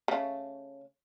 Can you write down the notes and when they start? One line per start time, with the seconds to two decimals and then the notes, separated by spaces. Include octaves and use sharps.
0.08 C#3 A3